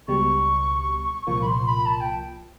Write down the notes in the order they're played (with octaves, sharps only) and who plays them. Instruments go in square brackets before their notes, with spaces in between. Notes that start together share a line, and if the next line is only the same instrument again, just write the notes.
[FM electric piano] C#2 B2 G3 [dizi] C#6
[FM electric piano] C2 A#2 F3 A#3 [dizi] C#6
[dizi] B5
C6
B5
A5
G5